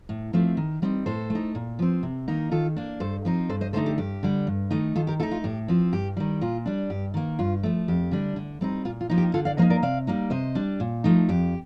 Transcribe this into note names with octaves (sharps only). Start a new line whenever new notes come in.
A2
F3 A3 C4
D#3
G3 C4 D#4
A2 A4 C5
A3
D#4
A#2
F3 C4
C3
D#3 A#3 D#4
D#3 F4 A4
A#3 D4
G2 A4 C5
F3 C4 D#4
G2 A4 C5
C5 D#5
D3 A3 D#4 A4 C5
G4
G2 G4
D3 G3
G2
D#3 A3 D#4
D#3 F4 A4
G4 A#4
A3 D#4 F4 A4
F4
A2 G4
F3 C4
G2 G4
D#3 G3
A#2 F4
G3 D4
G2 G4
D#3 A#3
G2 F4
F3 A3
F2 G4
D3 G3 D4
D3
G3 C4 D#4
A#2 F4
F4
F3 A#3 D#4
G4
D3 F4 A4
D5 F5
F3 A#3 D#4 C5 D#5
A#4 D5
C3 D5 F5
G3 A#3 D#4
C3 C5 D#5
G3 D4
A#2
F3 A3 D#4
F2 G4